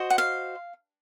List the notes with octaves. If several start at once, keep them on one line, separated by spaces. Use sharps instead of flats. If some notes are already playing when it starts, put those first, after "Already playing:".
Already playing: F#4 C5 D#5
F#5
F5